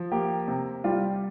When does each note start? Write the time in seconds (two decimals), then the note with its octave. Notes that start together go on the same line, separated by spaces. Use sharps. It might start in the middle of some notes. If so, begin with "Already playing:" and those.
Already playing: F3
0.12 A#3 G4
0.48 C3
0.84 G3 F4